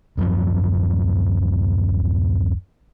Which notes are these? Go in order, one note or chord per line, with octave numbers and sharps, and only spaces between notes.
D1 F#2 F3